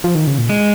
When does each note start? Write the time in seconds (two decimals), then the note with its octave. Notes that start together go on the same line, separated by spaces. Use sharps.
0.04 F3
0.15 D#3
0.27 C#3
0.38 A#2
0.49 G#3